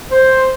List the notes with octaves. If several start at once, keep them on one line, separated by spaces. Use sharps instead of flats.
C5